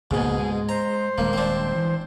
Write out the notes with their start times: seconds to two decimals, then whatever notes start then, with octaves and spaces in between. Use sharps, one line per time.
0.11 C#2 G#2 B2 A#3 G#4
0.39 G#3
0.69 C5 A#5
1.18 D#1 G#3 A#3
1.33 C4 D4
1.75 E3